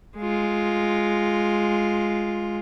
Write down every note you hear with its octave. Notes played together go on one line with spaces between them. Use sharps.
G#3 F4